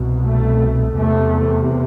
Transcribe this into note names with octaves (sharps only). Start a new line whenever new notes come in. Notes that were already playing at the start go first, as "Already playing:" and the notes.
Already playing: C2 B2
A3
E2 C3 A3